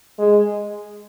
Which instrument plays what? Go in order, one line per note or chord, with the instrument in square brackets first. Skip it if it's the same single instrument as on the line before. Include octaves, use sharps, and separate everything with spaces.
[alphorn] G#3